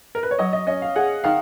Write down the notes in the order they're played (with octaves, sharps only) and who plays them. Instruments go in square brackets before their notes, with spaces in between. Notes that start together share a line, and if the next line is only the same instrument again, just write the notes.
[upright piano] A#4
B4
C#5
[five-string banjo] F#3 [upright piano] D#5
[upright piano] D#5
[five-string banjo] C#4 [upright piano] D#5
[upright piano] F5
[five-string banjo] G#4 [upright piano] F#5
[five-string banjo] D#3 [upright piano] F5